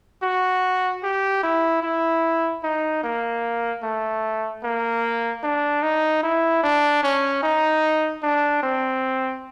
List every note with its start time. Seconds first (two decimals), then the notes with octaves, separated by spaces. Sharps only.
0.22 F#4
1.03 G4
1.43 E4
1.83 E4
2.63 D#4
3.03 A#3
3.83 A3
4.63 A#3
5.43 D4
5.83 D#4
6.23 E4
6.63 D4
7.03 C#4
7.43 D#4
8.23 D4
8.63 C4